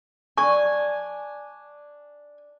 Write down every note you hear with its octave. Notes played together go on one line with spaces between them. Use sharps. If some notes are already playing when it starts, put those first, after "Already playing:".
D4 G#5 C#6